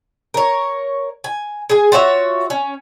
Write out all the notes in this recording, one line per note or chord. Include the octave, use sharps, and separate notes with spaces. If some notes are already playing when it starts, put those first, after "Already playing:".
A#4 C#5
G#5
G#4 G#5
F4 F#4 C#5 E5
C#4